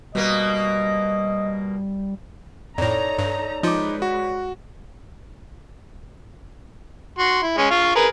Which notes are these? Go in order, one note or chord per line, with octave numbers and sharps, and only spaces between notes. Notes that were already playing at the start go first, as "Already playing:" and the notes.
B2 G3 A#3 D#5
F2 A2 D#4 A4 C#5 D5 A#5
G2
F3 G#3 D#4 F4 B4 D6
F#4
F#4 C6
E4
G#3 C#4
F4 F5 C#6
G#4 A#4 B4